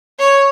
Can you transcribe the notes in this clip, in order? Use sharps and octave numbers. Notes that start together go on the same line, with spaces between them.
C#5